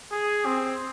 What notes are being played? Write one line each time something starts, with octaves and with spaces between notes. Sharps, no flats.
G#4
C4